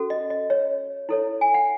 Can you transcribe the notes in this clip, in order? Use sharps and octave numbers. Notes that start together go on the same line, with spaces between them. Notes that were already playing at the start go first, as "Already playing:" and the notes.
Already playing: C#4 F#4 A4
D#5
D#5
C#5
E4 A4 C#5
G#5
F#5